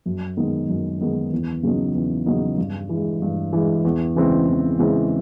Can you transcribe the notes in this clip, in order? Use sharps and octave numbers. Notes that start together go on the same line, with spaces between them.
F#2
D#3 G#3 B3 D#4
F#2
D#3 G#3 B3 D#4
E2
C#3 F#3 B3 D#4
E2
C#3 F#3 B3 D#4
G2
E3 G#3
G2
E3 G#3
E2
C#3 E3 G#3 C4
E2
C#3 E3 G#3 C4